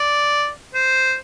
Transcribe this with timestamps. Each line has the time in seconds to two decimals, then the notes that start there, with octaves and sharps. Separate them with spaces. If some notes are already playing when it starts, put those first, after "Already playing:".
Already playing: D5
0.75 C5